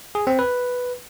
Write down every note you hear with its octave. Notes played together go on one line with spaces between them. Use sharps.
G#4
C4
B4